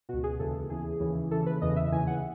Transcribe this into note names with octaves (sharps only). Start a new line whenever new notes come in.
C#2 B2 F#4
G#4
D#2 C#3 E3 A4
E2 C#3 E3 G#4
D#2 C#3 E3
D#2 C#3 E3 A4
B4
E2 C#3 E3 D#5
E5
D#2 C#3 E3 G#5
F#5